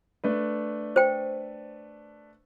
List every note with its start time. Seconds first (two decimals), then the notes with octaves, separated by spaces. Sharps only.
0.24 A3 D4 B4
0.96 C5 G5